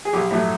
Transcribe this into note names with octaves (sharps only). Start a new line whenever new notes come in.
G#4
B1 G4
A2 F#3 A3